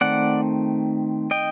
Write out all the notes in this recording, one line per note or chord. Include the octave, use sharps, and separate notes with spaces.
D#3 A3 C4 D5 F#5
D#5 G5